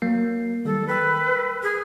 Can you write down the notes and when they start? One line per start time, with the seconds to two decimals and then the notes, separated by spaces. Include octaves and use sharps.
0.02 F#3 A#3 C7
0.65 D#3 G3 A4
0.88 A#4 B4 G5 E6
1.63 G#4